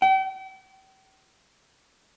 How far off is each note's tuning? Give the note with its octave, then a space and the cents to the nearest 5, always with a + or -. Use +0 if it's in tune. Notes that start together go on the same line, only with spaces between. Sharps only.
G5 -40